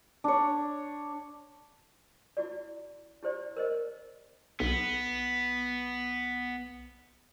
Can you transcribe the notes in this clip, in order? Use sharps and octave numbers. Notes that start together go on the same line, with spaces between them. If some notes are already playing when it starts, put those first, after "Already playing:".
D4 C#5
E4 F#4 D5
E4 G4 C5 D5
A#4 C5 D#5
B1 B3